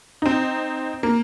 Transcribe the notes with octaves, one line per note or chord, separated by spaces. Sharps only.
C4 D#4
A#3